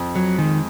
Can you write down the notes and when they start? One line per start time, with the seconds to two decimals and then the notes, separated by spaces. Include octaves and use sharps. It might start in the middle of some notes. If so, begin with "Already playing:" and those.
Already playing: F2
0.16 F#3
0.38 D#3 G#3